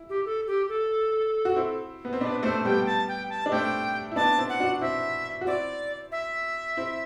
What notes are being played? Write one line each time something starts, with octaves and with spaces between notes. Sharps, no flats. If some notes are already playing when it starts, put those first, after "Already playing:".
Already playing: E4
G4
A4
G4
A4
F#4
C4 E4
B3
C4
B3 D4 B4
A3 C4 C5
G3 B3 G5
A5
G5
A5
D4
A3 C4 G5
E4
B3 D4 A5
C4 E4
F#5
D4 F#4
C4 E4 E5
F#4
C4 E4 D5
E5
C4 E4